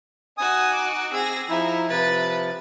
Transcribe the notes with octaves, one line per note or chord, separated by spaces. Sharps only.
D#4 F#4 G#5 D#6
D6
C4 G#4 E6 A#6
F3 D#4 E4 E5
C3 F3 B4 A6